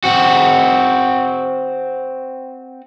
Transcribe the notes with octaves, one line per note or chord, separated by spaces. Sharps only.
C4 F#4